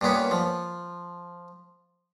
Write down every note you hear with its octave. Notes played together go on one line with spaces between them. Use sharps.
G2 A#2 B3 C#4
F3